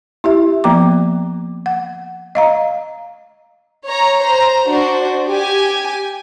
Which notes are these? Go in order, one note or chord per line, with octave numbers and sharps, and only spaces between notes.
E4 G4 E5
F3 A#3 B3 A#5 D6
F#5
D#5 F5 A#5
C#5 A#5
C5 A#5
D4 F#4 C5
G4 G#5